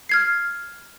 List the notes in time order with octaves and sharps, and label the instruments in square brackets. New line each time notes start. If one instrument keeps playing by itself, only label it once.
[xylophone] F6 G#6 C7